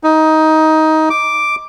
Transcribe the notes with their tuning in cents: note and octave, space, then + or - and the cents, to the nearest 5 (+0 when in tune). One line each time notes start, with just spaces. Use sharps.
D#4 +15
D6 +0